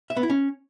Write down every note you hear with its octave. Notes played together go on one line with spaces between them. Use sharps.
E5
B3
E4
C#4